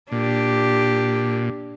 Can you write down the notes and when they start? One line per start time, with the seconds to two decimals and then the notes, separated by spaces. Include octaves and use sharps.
0.12 A#2 D4 G4